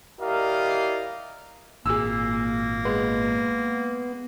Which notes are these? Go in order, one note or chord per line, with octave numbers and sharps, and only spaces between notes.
E4 G4 A#4 D5 D#5 F5
G#1 A#2 A#3 G#4 E6
G#3 B3